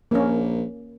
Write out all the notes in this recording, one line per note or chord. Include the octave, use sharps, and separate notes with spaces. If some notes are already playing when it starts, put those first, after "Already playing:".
A#1 A#3 C#4